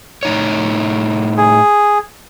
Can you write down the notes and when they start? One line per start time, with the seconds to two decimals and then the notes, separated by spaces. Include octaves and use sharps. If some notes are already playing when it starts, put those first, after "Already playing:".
0.23 A2 D#4 C#5
1.37 G#4